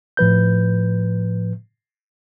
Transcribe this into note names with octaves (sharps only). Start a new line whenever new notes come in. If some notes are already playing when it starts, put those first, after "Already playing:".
A2 F3 B4 G6